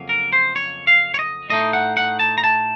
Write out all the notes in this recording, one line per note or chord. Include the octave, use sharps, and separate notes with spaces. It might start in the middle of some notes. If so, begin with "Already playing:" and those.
Already playing: F2 C#3 F#3 A#3 C#4
A#4
C5
C#5
F5
C#5
D#5
A2 A3 D#4 D#5
F#5
F#5
A5
A#5
A5